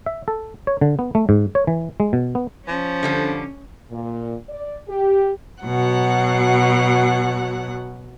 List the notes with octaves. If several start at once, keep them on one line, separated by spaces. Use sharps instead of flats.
E5
A4
C#5
D3
B3
A3
G#2
C#5
E3
G#3
B2
B3
F3 C#4
D3 G3 D4
A#2
D5
G4
B2 F#3 F#5